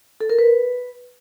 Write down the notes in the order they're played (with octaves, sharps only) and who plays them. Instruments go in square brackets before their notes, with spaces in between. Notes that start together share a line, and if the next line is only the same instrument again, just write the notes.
[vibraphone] A4
A#4
B4